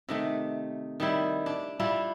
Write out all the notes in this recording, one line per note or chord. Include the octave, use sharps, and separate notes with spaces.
C3 D#3 A3
D#3 G3 E4
D4
G3 D4 E4 F4